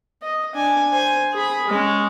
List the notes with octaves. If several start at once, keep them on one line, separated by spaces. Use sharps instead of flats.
D#5
D4 G#5
C5 G#5
G#4 B5
G#3 C#4